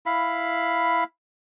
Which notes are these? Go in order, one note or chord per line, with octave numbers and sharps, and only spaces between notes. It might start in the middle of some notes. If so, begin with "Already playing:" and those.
E4 F5 B5